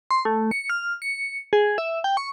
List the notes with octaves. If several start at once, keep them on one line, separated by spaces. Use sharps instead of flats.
C6
A3
C#7
F6
C#7
G#4
E5
G5
C#6